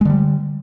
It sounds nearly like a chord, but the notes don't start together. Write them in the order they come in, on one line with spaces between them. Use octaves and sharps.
G#3 D3 G3